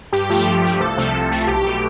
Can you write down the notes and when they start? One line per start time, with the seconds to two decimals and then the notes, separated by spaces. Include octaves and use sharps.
0.13 G2 G4
0.30 F3 A3
0.47 G2
0.63 F3 A3
0.81 C2 A4
0.97 C3 F3 A3
1.14 C2
1.31 C3 F3 A3
1.47 B1 G4
1.64 B2 A3